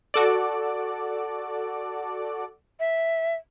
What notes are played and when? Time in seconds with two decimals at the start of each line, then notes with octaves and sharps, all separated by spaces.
0.14 F#4 A4 D5
2.80 E5